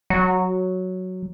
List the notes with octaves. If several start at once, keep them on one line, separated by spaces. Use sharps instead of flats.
F#3